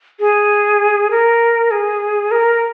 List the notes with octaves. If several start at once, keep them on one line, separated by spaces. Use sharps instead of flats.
G#4
A#4
G#4
A#4